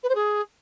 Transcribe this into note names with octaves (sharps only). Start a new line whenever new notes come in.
B4
C5
G#4